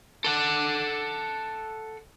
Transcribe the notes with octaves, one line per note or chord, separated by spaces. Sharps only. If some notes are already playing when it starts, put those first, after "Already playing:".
A4 F#5